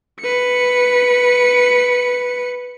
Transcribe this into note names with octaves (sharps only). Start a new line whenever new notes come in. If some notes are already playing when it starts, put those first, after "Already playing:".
B4 C#7